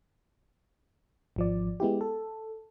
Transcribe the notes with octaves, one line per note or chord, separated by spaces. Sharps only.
G#1 F3 D5
G#3 B3 E4 G4
A4